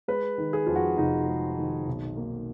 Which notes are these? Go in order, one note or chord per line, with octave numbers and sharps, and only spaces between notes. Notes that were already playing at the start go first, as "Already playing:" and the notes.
G#3 B4
D#3
G#4
F2 F4
F#4
F1 D#4
G#3
D#3
B1
A#3